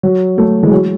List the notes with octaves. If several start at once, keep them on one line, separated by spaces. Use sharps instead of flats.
F#3
F#3 A3
E3 G#3
F#3